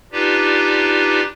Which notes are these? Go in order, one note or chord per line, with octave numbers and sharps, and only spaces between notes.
D4 D#4 F4 G4 B4 D5